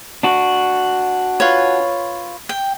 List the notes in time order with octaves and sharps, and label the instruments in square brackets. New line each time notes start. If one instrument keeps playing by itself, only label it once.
[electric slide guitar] D4 F#4
[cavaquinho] F4 B4 C#5
G5